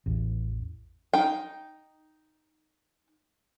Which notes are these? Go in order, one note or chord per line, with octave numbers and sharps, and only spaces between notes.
A1 E2
D#4 G5